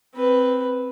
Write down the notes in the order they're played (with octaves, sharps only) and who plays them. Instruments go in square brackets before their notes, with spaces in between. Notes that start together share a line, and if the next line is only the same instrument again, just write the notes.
[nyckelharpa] C4 B4